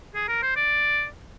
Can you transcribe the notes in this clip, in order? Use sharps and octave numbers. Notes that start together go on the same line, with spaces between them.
G#4
A#4
C5
D5